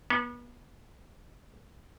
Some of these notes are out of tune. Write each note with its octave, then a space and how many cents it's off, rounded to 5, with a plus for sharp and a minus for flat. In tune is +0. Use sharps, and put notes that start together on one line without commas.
B3 -35